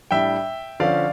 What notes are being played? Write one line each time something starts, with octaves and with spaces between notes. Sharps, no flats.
A2 G3 D4 E5 G5
D3 F3 C#4 D5 F5